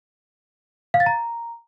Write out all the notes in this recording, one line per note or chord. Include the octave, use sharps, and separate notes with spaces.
F5
A6
A#5